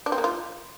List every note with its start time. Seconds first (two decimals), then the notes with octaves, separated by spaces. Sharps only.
0.06 D4
0.12 C4
0.18 A#3
0.24 F4